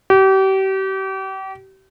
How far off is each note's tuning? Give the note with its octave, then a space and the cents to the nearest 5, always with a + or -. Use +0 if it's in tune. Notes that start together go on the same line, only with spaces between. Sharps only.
G4 -35